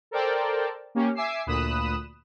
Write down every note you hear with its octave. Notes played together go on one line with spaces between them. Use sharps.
A4 A#4 C5 D5 G5 A5
A#3 C#4 G4
E5 G#5 D6 E6 C7
D2 A#2 B5 D#6 F#6 E7